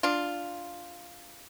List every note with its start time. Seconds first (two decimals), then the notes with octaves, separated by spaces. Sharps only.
0.03 D4 F4